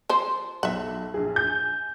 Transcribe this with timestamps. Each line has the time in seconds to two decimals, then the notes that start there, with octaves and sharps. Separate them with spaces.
0.09 F3 C5
0.63 B1 E5 F#5
1.14 A#1 G#4
1.36 G#5 G6